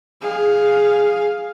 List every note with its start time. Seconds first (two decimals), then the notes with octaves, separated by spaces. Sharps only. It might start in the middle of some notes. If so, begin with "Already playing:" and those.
0.22 G#4 F5